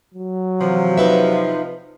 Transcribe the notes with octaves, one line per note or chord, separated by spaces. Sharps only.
F#3
C3 E3 F3
D#4 B4 E5